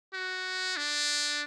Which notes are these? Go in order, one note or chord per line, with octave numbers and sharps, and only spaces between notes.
F#4
D4